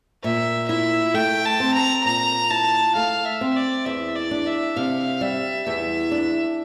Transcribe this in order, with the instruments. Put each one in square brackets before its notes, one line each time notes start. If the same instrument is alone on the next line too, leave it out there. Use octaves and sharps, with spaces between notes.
[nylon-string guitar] A#2 [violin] E5
[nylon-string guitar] E4 [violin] E5
[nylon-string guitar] A3 [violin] G5
[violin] A5
[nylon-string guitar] C4
[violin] A#5
[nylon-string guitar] A#2 [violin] A#5
[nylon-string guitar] E4 [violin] A5
[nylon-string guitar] A3 [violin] F5
[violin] E5
[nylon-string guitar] C4
[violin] D5
[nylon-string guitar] E2 [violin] E5
[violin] D5
[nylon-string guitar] D4
[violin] E5
[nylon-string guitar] C3 [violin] F5
[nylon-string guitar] G3 [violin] E5
[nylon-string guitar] E2 [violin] E5
[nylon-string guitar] D4